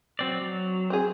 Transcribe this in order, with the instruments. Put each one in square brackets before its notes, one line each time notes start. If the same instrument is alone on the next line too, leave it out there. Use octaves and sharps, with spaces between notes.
[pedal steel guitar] F#3 C4 D5
F#3
[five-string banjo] C4 G#4